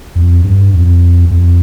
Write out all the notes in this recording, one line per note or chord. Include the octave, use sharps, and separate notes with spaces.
F2
G2
F2
F2